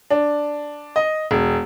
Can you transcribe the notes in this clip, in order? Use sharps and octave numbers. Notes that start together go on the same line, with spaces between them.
D4
D#5
E1